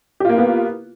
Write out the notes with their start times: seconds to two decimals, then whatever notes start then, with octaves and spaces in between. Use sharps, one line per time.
0.20 G4
0.25 F4
0.29 A#3
0.34 E4
0.38 B3